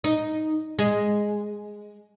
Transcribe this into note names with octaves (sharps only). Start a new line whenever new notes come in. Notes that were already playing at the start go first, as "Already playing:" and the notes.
D#4
G#3